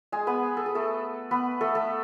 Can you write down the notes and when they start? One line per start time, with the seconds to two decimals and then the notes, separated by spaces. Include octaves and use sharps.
0.12 G#3 G#4
0.27 B3 B4
0.57 A4
0.66 G#4
0.75 A3 A4
1.31 B3 B4
1.61 A3 A4
1.75 A3 A4